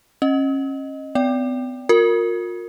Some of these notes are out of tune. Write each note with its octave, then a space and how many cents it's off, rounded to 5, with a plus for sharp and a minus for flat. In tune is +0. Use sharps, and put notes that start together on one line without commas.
C#4 -30 D#5 +0
B3 +45 D5 -30 G5 +0
F4 +40 A#4 -15